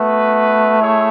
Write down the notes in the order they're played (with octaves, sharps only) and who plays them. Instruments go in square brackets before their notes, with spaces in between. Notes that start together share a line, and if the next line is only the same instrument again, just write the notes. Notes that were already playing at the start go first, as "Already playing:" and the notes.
Already playing: [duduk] A3 [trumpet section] B3 F#4 B4
[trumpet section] E4 G#4 C#5 E5